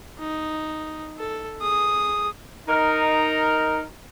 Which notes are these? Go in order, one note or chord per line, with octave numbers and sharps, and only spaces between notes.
D#4
A4
G#4 D#6
D#4 A#4